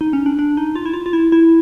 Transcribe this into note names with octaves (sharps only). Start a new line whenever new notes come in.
D#4
C#4
D4
D4
D#4
F4
E4
F4
F4
E4
E4